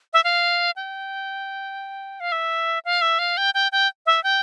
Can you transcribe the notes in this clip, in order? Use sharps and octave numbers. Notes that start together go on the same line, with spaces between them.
E5
F5
G5
F5
E5
F5
E5
F5
G5
G5
G5
E5
G5